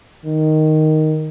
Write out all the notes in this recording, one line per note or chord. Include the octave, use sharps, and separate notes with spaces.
D#3